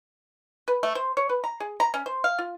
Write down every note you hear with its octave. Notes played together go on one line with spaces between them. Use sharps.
B4
A3
C5
C#5
B4
A#5
G#4
A#5
C#4
C5
F5
F4